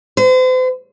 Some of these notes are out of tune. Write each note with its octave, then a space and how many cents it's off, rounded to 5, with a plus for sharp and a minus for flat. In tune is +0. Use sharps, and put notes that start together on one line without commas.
C5 -40